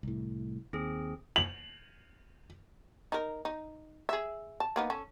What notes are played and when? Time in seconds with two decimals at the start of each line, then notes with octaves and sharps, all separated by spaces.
0.03 C2 A2
0.73 D#2 C4 G#4
1.36 F#7
3.12 D#4 A#4
3.45 D#4
4.09 G#4 E5
4.60 A5
4.76 A#3 B3 D#4
4.90 C#4 A4